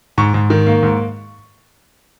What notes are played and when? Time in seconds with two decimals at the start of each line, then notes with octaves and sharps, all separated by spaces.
0.18 G#2 C#6
0.34 G#2
0.50 D#3
0.67 A#3
0.83 G#2